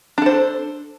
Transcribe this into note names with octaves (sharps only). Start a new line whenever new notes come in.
D4 A4 C5